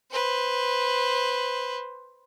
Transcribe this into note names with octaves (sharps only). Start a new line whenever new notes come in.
B4 C5